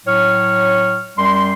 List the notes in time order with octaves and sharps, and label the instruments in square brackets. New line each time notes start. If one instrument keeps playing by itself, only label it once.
[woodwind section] A2 F#3 C#5 C#6 F6
F#2 G3 C6